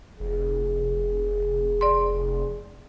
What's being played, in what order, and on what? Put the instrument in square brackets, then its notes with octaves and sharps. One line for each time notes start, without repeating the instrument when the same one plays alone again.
[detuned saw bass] F1 [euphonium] G#4
[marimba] D5 C6